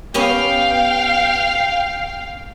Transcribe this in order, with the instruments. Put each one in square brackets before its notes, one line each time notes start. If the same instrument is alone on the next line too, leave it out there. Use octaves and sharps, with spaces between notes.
[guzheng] B3 C#4 G4 [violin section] F5 G5